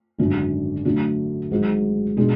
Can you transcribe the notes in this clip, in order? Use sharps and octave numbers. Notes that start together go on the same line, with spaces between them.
G#1 F#2 D3 F#3
D3 F#3 A3 D4
G#1 G#2 F#3
B2 G#3 D4